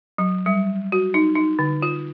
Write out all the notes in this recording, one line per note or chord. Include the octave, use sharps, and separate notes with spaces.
F#3
G3
F#4
D#4
D#4
D3
F4